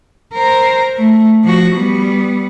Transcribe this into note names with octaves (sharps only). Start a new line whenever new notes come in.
A#4 C5
A3
F3 F#4
G3 B3